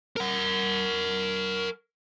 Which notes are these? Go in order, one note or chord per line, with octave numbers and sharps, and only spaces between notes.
A#4 F#5